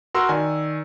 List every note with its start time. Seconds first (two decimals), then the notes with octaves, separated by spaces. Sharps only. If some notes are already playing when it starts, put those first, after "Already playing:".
0.14 F#4 A#4 C6 E6
0.29 D#3 D5 G#5